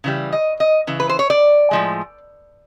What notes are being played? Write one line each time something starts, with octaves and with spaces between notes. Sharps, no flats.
C#3 E3 G3
D#5
D#5
C#3 E3
B4
C5
C#5
D5
A2 F3 G#3